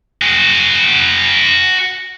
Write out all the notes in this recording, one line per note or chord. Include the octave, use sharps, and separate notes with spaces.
F#4 G#4